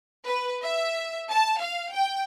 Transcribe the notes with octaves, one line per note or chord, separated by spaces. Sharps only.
B4
E5
A5
F5
G5